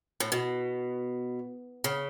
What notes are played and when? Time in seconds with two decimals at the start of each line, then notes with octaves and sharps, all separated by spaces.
0.20 A2
0.32 B2
1.84 C#3